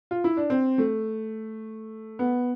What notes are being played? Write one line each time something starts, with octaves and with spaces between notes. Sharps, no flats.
F4
E4
D4
C4
A3
B3